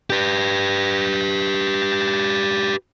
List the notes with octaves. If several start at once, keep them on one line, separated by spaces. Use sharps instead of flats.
G4 B4